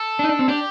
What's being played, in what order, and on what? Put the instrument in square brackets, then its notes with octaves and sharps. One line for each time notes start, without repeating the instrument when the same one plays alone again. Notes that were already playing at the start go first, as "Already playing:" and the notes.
Already playing: [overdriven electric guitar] A4
[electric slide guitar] D4
D#4
D4
C4
[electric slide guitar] D4 [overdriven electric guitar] G4